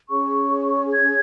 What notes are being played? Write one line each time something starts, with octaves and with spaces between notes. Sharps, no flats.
C#4 G#4 C#5 C#6
G#6